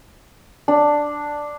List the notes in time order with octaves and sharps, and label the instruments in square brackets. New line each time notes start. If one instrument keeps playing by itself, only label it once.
[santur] D4